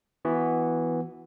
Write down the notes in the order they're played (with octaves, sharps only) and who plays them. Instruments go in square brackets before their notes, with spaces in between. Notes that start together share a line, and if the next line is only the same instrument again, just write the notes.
[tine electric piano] E3 B3 F#4